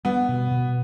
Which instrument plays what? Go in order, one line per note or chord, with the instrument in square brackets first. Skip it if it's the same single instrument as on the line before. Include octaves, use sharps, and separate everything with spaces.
[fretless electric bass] G3 [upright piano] B3
[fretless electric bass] B2
B2